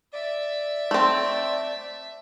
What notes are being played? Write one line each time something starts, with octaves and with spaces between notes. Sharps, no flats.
D5 E5
A3 C4